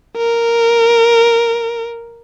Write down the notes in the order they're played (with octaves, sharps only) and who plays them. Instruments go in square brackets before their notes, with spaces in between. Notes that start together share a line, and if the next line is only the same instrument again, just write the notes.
[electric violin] A#4